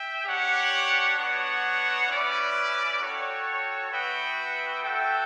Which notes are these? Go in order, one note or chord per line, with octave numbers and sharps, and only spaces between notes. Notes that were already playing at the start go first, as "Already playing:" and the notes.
Already playing: E5 G5
D4 G4 C#5 F#5
B3 D4 F#4 C#5 F#5
C#4 E4 B4 D5
F#4 A4 C#5 G5
B3 F#4 B4 E5 G5
F#4 A4 E5 G5